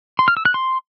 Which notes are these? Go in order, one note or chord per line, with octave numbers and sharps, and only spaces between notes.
C6
F6
E6
F#6
C6